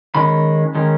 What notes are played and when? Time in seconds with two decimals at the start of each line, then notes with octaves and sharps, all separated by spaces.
0.15 D#3 G#3 C#4 B5
0.75 D#3 G#3 C#4